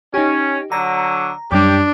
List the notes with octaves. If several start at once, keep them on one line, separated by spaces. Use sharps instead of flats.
C#4 D#4 G4
D3 F#3 A#5
F#2 G3 D4 G4